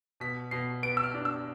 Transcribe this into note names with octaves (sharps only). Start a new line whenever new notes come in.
B2 B6
B2 C7
B3 D7
E6
F6
D4
E6